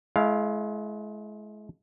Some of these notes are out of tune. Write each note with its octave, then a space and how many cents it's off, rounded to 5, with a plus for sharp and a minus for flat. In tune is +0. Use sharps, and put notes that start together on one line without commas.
G#3 +35 E4 +10 F5 +0